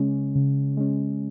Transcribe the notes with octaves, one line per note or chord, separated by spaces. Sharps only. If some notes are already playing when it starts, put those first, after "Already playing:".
Already playing: C#3 G#3 C#4
C#3
G#3 C#4